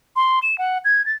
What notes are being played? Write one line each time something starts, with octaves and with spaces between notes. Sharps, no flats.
C6
E7
F#5
G#6
A6